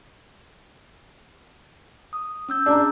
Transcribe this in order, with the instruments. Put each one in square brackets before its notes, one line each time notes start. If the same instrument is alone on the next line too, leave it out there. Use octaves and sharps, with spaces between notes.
[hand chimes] D#6
C#4 E6 G6
[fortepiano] D4 [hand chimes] G#4 A#5